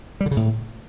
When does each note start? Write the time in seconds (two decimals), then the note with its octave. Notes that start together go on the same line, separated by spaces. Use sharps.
0.21 G3
0.26 D3
0.31 C#3
0.37 A2